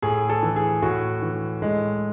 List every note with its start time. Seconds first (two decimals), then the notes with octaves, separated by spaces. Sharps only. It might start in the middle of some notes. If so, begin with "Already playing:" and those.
0.02 A2 G#4
0.29 A4
0.43 E3
0.56 G#4
0.82 A2 F#4
1.22 E3
1.62 A2 G#3